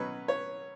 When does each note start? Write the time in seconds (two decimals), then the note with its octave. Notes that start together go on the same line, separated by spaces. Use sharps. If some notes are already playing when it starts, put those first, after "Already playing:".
Already playing: B2 F#3 C#4 B4
0.28 C#5